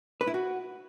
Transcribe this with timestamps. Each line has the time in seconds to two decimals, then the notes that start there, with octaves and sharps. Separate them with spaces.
0.21 B4
0.27 E4
0.34 F#4